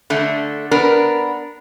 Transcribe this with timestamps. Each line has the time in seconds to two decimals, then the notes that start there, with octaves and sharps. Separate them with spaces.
0.10 D3 A3
0.71 B3 D4 A#4